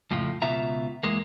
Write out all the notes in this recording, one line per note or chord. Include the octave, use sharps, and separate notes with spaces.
F2 A2 C#3 F3
C#2 B2 F4 E5 A#5
E2 G#3 A#3